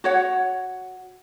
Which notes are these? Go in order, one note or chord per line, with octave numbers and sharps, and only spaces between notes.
F#4 C#5 F#5